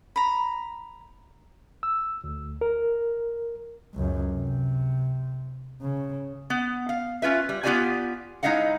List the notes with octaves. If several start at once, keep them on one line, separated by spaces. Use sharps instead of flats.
A#5 B5
E6
D2
A#4
C#2 F#2
C3
C#3
B3
F5
C#4 F4 B4 E5
G3
B3 F4 G4 D5 F5 G#5
G#3 D#4 E4 D#5 F5 F#5